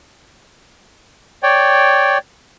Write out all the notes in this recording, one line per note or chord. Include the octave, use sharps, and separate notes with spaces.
C#5 D5 G5